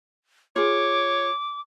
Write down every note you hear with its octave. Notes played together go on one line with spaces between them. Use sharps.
F4 G#4 C#5 D6